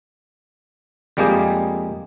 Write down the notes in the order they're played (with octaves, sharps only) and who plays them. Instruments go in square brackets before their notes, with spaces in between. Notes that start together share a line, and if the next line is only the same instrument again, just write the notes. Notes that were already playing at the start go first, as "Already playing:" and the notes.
[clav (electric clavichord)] F2 G3 G#3 A#3 G4 G#4